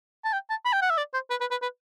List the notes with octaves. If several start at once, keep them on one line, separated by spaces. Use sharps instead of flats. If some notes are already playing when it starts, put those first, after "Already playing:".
A5
G5
A5
B5
G5
F#5
E5
D5
C5
B4
B4
B4
B4